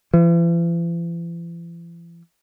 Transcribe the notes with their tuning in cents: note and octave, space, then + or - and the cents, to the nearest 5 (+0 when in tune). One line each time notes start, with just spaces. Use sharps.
E3 +45